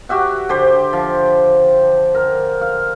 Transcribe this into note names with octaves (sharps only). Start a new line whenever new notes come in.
F#4 G4 E5 F#5
D3 G4 C5
F3
A#4
F5